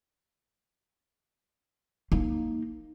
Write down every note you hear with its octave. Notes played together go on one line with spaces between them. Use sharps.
A#3 D#4